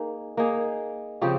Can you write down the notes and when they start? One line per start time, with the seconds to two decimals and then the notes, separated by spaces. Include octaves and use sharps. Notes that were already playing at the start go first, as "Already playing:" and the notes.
Already playing: A#3 D#4 G#4
0.37 A#3 D#4 G#4
1.22 C#3 F3 C4 G4